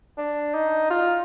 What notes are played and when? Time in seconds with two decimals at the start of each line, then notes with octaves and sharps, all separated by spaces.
0.18 D4
0.55 D#4
0.90 F4